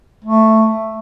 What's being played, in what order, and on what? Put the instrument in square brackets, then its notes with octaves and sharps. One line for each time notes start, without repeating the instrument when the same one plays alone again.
[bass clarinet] A3